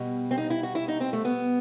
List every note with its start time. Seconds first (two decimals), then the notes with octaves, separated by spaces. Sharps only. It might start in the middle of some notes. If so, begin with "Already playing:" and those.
Already playing: B2 G3
0.31 C4
0.37 D#4
0.50 E4
0.63 F#4
0.75 E4
0.88 D#4
1.00 C4
1.13 A3
1.25 B3